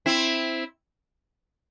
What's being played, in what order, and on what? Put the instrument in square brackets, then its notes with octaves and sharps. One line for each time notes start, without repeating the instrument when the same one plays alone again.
[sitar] C4 E4